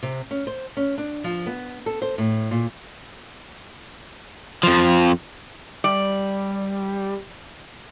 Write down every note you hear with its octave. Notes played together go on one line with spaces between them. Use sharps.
C3
C#4
C5
C#4
D4
F3
B3
A4
C5
A2
A#2
F2 F3
G3 D5